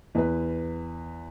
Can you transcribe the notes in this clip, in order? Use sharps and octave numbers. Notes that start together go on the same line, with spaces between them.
E2 B4